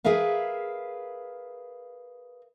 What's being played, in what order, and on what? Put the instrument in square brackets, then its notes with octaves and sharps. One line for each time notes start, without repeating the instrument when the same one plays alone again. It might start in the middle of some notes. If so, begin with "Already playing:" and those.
[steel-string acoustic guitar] G#4 A#4 B4 E5 F5